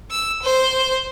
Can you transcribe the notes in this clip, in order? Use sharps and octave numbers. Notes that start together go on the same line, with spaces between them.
E6
C5